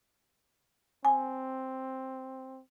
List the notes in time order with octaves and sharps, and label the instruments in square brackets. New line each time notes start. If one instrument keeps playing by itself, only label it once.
[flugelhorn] C4 [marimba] G#5